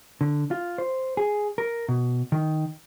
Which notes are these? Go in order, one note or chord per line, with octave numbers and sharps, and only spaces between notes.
D3
F4
C5
G#4
A#4
B2
D#3